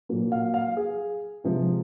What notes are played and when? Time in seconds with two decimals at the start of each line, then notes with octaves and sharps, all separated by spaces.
0.09 A#2 F#3 A#3
0.32 F5
0.54 F5
0.77 G#4
1.44 C3 F3 G#3